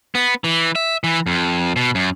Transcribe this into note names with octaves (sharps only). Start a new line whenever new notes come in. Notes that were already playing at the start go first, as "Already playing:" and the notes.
B3
E3
E5
E3
F2
B2
F#2